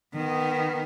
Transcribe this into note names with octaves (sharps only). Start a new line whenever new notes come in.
D#3 B3